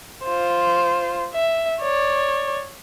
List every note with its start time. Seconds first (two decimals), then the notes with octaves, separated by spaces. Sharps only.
0.24 F4 C5
1.33 E5
1.81 C#5 D5